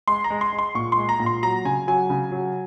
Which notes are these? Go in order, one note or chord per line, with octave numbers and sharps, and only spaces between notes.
G#3 C6
A#5
G#3
C6
G#3
C6
A#2 C#6
C6
G#3
A#5
A#2
C6
F#3 A#5
C#3 G#5
F#3 G#5
C#3
F#3